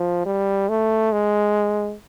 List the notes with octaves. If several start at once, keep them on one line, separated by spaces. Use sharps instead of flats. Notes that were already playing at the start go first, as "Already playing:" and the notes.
Already playing: F3
G3
A3
G#3